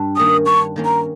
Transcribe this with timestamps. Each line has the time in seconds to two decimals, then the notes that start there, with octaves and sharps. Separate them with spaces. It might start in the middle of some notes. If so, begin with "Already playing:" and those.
Already playing: G2
0.16 D#3 A#3 C#4 D#6
0.46 G2 C#6
0.76 D#3 A#3 C#4
0.85 A#5